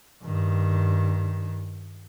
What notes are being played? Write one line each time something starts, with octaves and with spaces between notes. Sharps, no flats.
G2 D#3